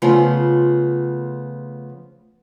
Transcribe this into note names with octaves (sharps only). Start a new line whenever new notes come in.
C#3 F3 A3 B3 F4 C5